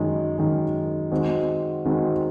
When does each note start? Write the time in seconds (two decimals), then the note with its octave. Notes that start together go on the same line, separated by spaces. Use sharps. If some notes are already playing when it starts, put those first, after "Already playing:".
Already playing: F#2 D#3 G#3
0.38 F#2 D#3 G#3
1.12 D#3 G#3 C4 F#4
1.85 D#3 G#3 C4 F#4